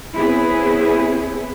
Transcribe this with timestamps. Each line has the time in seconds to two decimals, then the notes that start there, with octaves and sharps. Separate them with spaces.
0.17 B3 C4 E4 G#4 B4 C#5